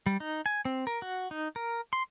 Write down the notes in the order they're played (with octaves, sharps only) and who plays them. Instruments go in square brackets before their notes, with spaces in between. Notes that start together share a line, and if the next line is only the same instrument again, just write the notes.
[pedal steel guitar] G3
D#4
G#5
C4
A#4
F#4
D#4
A#4
C6